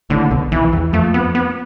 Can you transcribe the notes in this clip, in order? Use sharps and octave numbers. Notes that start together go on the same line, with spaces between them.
A1 A2 D3
B1 B2
B1 B2 E3
E2 E3
F2 F3 A3
B3
B3